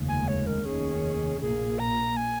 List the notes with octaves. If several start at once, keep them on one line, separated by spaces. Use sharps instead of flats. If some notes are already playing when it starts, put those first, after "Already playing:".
Already playing: F1 D#2 C#3 G#3
G#5
C#5
A#4
F1 D#2 D#3 C#4 G#4
A#1 A#2 A#3 G#4
A#5
G#5